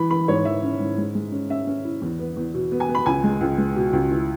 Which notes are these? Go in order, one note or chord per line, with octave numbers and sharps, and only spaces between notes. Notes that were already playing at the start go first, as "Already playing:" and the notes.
Already playing: E3 B5
E3 B5
G#2 C#5
E3 E5
C#4
G#2
G#3
G#3
C#4
C#4 E5
C#4
E4
E2
B3
E2
B2
B3
G#5
B3
B5
C#2 G#5
G#3
C#2
G#3
B2
C#2
E4